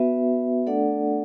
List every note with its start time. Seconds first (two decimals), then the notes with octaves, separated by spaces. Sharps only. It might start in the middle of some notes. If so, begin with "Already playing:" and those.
Already playing: B3 F#4 B4 E5
0.67 A3 D4 A4 D5 F#5